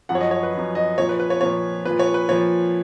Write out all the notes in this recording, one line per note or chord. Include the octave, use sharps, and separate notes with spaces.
F#2 F3 F#5
C#5
D#5
C#5
B4
F#2 F3
D#5
A#2 F3 C#5
B4
B4
C#5
A#2 F3 C#5
A#2 F3 B4
C#5
B4
A#2 F3 C#5